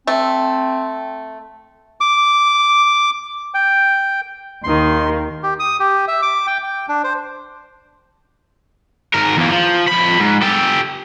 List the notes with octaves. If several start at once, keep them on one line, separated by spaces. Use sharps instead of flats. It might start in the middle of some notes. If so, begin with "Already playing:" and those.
A3 C4
D6
G5
D#2 D#3 C6
G4
D#6
G4
E5
D6
G5
G5
D4
C5
G#2 A#4
E2 A#3
F3
F2 B5
G#2
G4 A4